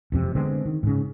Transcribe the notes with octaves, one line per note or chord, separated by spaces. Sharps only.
E1 F2 C3
D3 G#3 B3 C4
D#3
G#2 C#3